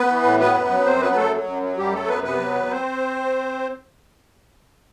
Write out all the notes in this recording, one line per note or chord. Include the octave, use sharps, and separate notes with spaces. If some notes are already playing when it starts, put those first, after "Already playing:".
Already playing: B3 B4
E3
A2
F#3 B3 B4
F#2
F#3
F#2 C4 C5
F#3 B3 B4
F#2 A3 A4
F#3
F#2
F#3
F#2 G3 G4
F#3 A3 A4
F#2 B3 B4
C3 B3 B4
F#3
E2
C4 C5